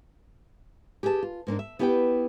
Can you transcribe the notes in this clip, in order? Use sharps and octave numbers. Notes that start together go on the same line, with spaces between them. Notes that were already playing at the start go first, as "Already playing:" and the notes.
G4 G#4 B4 E5 A5
F4
G#2 A#3 C#4 D4
E5
B3 E4 G4 B4 C#5 G5